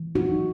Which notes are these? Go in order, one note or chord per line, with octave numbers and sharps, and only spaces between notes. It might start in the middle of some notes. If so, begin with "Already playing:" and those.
Already playing: E3
D#4 F#4